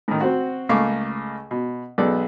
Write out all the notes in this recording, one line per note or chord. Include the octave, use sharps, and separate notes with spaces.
A2 D#3
C4 F#4
C#2 A3 A#3 F5 C#6 D6
B2
B1 G#3 B3 A4 D5